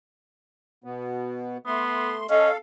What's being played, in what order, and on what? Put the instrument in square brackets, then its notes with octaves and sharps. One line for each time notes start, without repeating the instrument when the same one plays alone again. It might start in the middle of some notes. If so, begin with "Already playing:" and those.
[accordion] B2 B3
[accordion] A3 C6 [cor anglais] B3
[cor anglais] C#4 [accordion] A4 F5 [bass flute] D#5